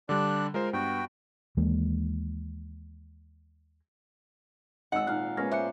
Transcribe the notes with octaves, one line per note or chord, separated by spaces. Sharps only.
D3 G3 D4 D5 F#6
G#3 F4 A#4 C5
G2 B3 F#4 G5
D#2 E3 G#3 A#3
G#1 D#5 F#5 E6
A#2 D#4 F5 F6 F#6
G#3 A#3 B3 C#4 F6 G#6 A#6
C5 D5 E5 F#6 C#7